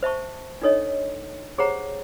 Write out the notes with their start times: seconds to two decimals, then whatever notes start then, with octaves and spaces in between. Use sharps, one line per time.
0.03 C5 E5 A5 C#6
0.62 D4 D#4 A4 C#5 D#5
1.58 G4 G#4 C5 C#5 F#5 A#5